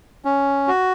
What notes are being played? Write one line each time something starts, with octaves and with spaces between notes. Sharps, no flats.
C#4
F#4